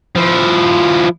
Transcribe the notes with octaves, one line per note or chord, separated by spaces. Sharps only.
F3 E4